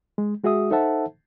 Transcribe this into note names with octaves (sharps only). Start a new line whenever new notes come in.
G#3
G#3 F#4 G#4 E5 D#6
D#4 A4 C5 E5 F#5 A5